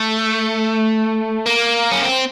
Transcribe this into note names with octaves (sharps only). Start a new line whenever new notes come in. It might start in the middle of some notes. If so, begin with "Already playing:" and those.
Already playing: A3
A#3
C#4
C4